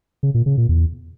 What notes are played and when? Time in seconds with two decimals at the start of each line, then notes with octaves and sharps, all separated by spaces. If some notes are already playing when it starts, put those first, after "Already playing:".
0.23 C#3
0.34 A#2
0.46 C#3
0.57 A#2
0.69 E2